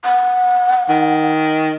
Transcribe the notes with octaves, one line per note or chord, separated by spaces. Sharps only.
F#5
D#3